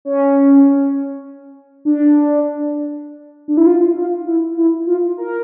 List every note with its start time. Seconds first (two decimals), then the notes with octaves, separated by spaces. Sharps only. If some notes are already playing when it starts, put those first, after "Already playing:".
0.05 C#4
1.85 D4
3.48 D4
3.57 E4
3.67 F4
3.97 F4
4.27 E4
4.57 E4
4.87 F4
5.18 A#4